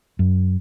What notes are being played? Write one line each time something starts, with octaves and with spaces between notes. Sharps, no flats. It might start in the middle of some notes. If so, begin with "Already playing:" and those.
F#2